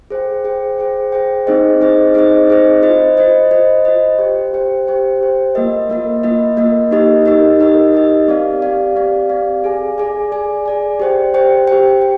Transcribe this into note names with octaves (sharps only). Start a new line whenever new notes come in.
G#4 C5 G5
G#4 C5 G5
G#4 C5 G5
G#4 C5 G5
C4 D#4 G#4 C5 D#5
C4 D#4 G#4 C5 D#5
C4 D#4 G#4 C5 D#5
C4 D#4 G#4 C5 D#5
F4 C5 D#5
F4 C5 D#5
F4 C5 D#5
F4 C5 D#5
G4 C5 G5
G4 C5 G5
G4 C5 G5
G4 C5 G5
A#3 F4 A#4 D#5
A#3 F4 A#4 D#5
A#3 F4 A#4 D#5
A#3 F4 A#4 D#5
D#4 G4 A#4 D#5
D#4 G4 A#4 D#5
D#4 G4 A#4 D#5
D#4 G4 A#4 D#5
C4 G4 D5 F5
C4 G4 D5 F5
C4 G4 D5 F5
C4 G4 D5 F5
G#4 D5 G#5
G#4 D5 G#5
G#4 D5 G#5
G#4 D5 G#5
G4 C5 G5
G4 C5 G5
G4 C5 G5
G5